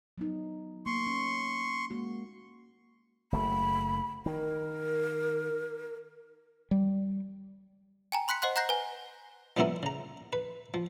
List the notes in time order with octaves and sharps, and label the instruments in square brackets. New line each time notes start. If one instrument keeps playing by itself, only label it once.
[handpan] F#3 B3 D#4
[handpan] A#3 [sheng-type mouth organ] C6 C#6
[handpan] C#4
G#3 A#3 F#4
[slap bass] F#1 A3 [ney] B5
[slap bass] D#3 [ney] A#4
[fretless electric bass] G3
[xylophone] G5 G#5 A#5
B5 C6 F#6 B6 C#7
C5 D#5 F#5 C6 F#6
F#5 A#5 F#6 G6 A#6 C7
B4 G#5
[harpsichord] F3 G3 B3 C#4 E4 A#4
C#3 A#5
B4
F3